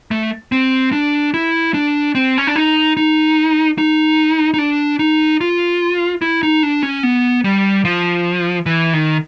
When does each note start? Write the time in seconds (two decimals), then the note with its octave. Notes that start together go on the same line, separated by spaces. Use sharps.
0.11 A3
0.52 C4
0.92 D4
1.34 E4
1.74 D4
2.15 C4
2.38 C#4
2.47 D4
2.56 D#4
2.97 D#4
3.78 D#4
4.54 D#4
4.58 D4
4.99 D#4
5.41 F4
6.22 E4
6.43 D#4
6.63 D4
6.83 C#4
7.03 B3
7.44 G3
7.85 F3
8.66 E3
8.93 D#3